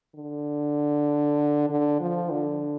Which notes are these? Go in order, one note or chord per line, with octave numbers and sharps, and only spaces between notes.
D3
D3
F3
D3